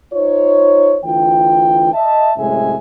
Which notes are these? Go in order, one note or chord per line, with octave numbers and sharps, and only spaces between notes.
D#4 F4 C5 C#5
D2 E3 F4 G5
D#5 E5 A5
F#2 A2 C3 G#3 E5 G#5